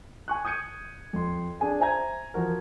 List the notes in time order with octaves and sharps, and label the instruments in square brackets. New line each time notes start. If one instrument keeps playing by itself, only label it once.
[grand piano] G#5 C#6 F#6
D#6 G6 G#6 C#7 D#7
F2 C6
D4 G#4 G#5 A5
C5 E5 G#5 A#5 G#6
E3 F3 F#4 A#4